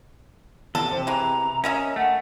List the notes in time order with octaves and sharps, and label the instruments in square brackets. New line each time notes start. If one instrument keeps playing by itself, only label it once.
[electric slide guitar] E2 C3 [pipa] A4
[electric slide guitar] C3 [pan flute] C5
[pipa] E3 G#3 [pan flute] A#5
[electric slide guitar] C#4 [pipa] A#4 D#5 E5
[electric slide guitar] A3 [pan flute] F#5